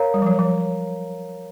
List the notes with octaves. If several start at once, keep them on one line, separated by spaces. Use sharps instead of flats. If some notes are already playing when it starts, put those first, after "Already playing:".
Already playing: A#4 C#5 F5 A#5
G3
F3
F#3
F3